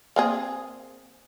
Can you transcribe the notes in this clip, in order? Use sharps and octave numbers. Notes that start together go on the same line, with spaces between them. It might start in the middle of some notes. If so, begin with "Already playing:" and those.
A#3 C4 G#4